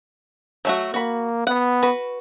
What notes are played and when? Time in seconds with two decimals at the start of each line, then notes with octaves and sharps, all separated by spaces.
0.65 F#3 A3 F#4
0.94 A#3 F#4 B5
1.47 B3 F#5
1.83 F#4 B4